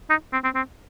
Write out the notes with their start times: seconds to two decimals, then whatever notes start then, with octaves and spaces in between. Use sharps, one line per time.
0.10 D#4
0.33 C4
0.44 C4
0.55 C4